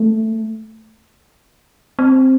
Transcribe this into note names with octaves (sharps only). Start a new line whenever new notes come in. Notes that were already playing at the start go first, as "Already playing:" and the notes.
Already playing: A3
C4